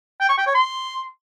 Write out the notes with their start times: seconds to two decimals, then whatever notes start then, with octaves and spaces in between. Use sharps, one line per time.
0.21 G5
0.29 C#6
0.38 G5
0.46 C#5
0.55 C6